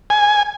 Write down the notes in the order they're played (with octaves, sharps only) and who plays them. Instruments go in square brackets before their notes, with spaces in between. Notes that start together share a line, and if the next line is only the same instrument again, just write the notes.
[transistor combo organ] G#5